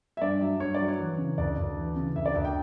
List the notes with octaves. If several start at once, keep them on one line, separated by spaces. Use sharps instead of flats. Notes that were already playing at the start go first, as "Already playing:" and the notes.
E5
G2 D5
F#3 E5
G2 C#5
D5
F#3
C#5
E3
C#3
D2 D5
D2
E3
C#3
D2 E5
D5
D2 E5
G5